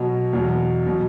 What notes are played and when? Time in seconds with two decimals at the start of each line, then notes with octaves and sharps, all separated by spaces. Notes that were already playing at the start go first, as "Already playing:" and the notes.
Already playing: B2 F#3
0.33 E2 B2 F#3
0.86 B2 F#3